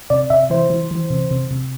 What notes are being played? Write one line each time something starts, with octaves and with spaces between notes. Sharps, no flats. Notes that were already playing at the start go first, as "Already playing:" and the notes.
C3 D5
C3 E5
E3 C5
E3
E3
C3
C3
C3